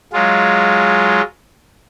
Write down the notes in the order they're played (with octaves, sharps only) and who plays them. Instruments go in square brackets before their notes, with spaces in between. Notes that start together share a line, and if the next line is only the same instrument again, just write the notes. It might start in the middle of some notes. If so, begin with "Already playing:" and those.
[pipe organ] F#3 G#3 F4